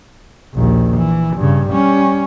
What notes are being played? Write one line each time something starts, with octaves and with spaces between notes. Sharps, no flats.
A#1 D#2
E3
G2 C#3
G3 C#4